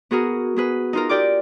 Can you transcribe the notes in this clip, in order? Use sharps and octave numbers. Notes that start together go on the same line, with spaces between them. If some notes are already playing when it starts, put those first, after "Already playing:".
B3 F#4 G#4 A#4
B3 G#4 B4
D#4 F4 A#4
G4 A#4 D5 G5 D6